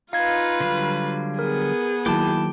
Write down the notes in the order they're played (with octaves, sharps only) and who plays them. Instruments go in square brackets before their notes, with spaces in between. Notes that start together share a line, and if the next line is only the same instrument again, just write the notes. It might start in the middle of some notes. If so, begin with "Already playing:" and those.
[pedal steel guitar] D#4 [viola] F4 B4 [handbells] F5 G#6
[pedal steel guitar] D3 F#3 G3
[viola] B3 G#4 [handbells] A#4
[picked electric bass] D#3 F#3 A#3 [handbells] E4 A5 [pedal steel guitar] G5 D6